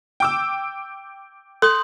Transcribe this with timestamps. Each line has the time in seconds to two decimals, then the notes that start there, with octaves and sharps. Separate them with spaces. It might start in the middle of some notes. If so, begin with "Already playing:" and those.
0.20 G5 D6 E6
1.62 A4 C6 D#6 G6